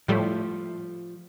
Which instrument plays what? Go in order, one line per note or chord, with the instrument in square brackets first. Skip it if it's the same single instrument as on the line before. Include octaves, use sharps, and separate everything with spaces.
[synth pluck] A2 G3 A3 [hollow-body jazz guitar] F3